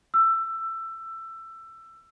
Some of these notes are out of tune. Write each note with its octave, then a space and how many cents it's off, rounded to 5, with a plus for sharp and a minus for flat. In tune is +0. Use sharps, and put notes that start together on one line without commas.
E6 +20